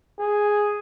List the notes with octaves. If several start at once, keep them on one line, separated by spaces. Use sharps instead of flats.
G#4